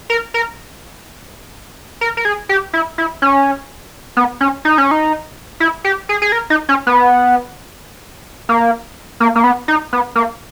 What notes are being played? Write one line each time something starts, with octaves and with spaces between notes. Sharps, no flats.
A#4
A#4
A#4
A#4
G#4
G4
E4
E4
C#4
B3
C#4
D#4
C#4
D#4
E4
G4
G#4
G#4
A#4
D#4
C#4
B3
A#3
A#3
A#3
B3
D#4
B3
A#3